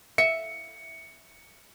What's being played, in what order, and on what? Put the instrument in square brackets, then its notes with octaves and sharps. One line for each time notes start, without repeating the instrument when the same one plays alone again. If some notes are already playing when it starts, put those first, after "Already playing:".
[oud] E5 [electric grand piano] C#7